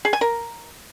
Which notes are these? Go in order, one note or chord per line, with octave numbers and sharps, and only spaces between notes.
G#4
G#5
A#4